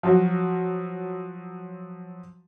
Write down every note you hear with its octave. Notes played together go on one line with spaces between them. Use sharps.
F3 F#3 F#4